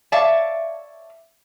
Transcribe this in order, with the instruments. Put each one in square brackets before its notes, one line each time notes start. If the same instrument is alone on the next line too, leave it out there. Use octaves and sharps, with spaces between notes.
[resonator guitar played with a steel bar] C#5 D5 E5 F5 A5